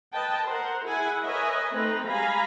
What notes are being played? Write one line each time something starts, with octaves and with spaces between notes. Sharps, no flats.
B4 D#5 G5 A5
A#4 C5 F#5
E4 G#4 F#5 G#5
A#4 B4 C#5 D#5 E5 G#5
A3 C4 D#4 B4 D#5 A#5
G3 G#3 F5 G#5 A#5 B5